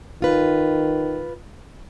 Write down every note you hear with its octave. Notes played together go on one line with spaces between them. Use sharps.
D#3 F4 B4